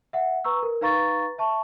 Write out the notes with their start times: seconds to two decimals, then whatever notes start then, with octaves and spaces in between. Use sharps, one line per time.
0.13 E5 F#5
0.44 B4 A#5 C#6 E6
0.63 A#4
0.81 D#4 B4 F5 A#5 C#6 A6
1.38 E5 A5 C#6